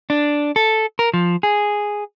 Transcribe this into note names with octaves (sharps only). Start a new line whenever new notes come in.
D4
A4
A#4
F3
G#4